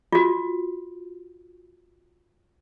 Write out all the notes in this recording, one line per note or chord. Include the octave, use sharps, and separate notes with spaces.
F4 F#4